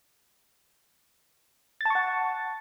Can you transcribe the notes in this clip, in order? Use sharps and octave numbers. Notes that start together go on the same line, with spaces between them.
F#5 A5 C#6 A6